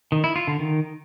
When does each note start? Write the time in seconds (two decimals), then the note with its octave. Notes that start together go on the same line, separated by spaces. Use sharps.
0.12 D#3
0.24 E4
0.36 F4
0.47 D3
0.59 D#3